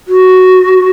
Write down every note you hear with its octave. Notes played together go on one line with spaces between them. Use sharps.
F#4